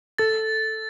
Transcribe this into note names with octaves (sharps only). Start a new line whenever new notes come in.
A4 A6